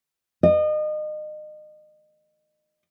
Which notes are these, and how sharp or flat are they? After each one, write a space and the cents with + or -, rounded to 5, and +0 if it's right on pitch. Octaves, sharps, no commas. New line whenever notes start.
D#5 -30